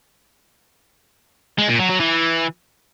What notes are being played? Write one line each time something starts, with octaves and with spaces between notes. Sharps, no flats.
G#3
A#2
F#3
F#3
E3